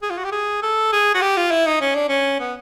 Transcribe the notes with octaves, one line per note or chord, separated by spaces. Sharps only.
G#4
F4
F#4
G4
G#4
A4
G#4
F#4
G4
F4
E4
D#4
C#4
D4
C#4
B3